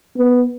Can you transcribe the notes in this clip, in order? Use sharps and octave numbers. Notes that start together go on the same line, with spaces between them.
B3